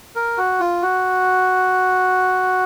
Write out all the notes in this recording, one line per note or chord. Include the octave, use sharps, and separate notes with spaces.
A#4
F#4
F4
F#4